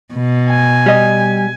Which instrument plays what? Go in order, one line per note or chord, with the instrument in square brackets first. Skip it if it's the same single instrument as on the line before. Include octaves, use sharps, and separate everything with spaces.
[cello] B2
[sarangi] G#5
[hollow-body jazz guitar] G3 D#5